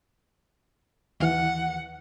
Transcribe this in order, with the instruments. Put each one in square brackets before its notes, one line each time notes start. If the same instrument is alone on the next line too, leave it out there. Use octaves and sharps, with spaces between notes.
[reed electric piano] D#2 E3 [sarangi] F#5